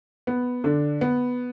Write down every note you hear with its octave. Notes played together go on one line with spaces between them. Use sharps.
B3
D3 D4
B3